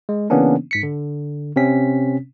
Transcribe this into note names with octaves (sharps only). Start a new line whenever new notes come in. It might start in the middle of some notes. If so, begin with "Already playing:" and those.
G#3
C#3 E3 A#3 B3 C#4 D4
G#2 B6 C#7
D3
C3 C4 C#4 B6